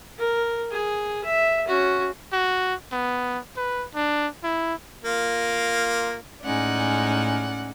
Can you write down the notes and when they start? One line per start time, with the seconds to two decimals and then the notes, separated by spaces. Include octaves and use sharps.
0.19 A#4
0.71 G#4
1.24 E5
1.68 C#4 F#4
2.33 F#4
2.92 B3
3.57 B4
3.95 D4
4.44 E4
5.04 A#3 F4
6.44 A2 G#3 C#4 D#4 D5 F#5